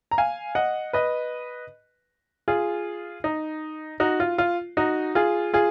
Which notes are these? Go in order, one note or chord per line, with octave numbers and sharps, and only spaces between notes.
A#5
F5 G#5
D#5 F#5
B4 D#5
F4 G#4
D#4
D#4 F#4
F4
F4
D#4 F#4
F4 G#4
F4 G#4